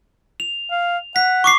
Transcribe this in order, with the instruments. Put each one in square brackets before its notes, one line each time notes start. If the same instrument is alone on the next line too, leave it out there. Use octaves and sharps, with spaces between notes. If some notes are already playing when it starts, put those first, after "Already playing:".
[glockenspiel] F7
[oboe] F5
[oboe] F#5 [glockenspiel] B6
[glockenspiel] C#6 D6 C7